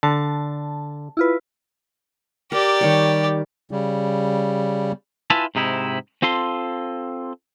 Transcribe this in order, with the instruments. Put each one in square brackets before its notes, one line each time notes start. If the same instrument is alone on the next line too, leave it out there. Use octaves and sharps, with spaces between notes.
[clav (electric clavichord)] D3 [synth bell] A5
[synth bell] E4 F4 B4
[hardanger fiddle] G4 D5 [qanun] A#4
[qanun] D#3 G3 C#5
[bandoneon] C#3 G3
[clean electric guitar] E4 F4 B4 E5 G#5 A5
G#2 C3 D#4 E4
C4 F4 A4 C6